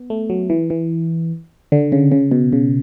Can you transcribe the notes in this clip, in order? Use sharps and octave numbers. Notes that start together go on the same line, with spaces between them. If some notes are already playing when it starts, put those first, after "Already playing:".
Already playing: B3
A3
F#3
E3
E3
D3
C#3
C#3
B2
C#3